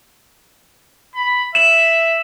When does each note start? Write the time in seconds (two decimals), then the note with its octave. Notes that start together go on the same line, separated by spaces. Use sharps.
1.16 B5
1.55 E5 E7 F#7